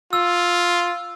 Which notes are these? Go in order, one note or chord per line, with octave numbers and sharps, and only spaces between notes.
F4 E6